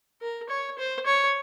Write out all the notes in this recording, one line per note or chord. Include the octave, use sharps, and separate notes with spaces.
A#4
C#5
C5
C#5